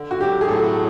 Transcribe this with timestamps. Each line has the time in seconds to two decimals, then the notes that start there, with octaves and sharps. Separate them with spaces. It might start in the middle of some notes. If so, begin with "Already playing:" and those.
Already playing: D3
0.11 F#4
0.21 F#3 G4
0.41 G#4
0.48 A2 A4